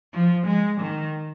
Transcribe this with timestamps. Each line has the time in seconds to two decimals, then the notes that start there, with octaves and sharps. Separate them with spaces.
0.13 F3
0.47 G#3
0.81 D#3